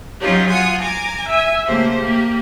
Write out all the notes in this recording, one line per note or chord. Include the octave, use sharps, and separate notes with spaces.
F#3 C#4 D#4 F4 G4
F4 F#5 G#5 D#6
G#5 A#5 D6
E5 G#5
C#3 A3 A#3 G4 C5
A#3 G4